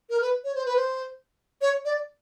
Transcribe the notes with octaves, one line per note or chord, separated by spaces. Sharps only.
A#4
B4
C#5
C5
B4
C5
C#5
D5